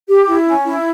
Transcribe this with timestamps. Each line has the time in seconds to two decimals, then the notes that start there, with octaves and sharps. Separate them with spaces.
0.08 G4
0.28 E4
0.47 C#4
0.65 E4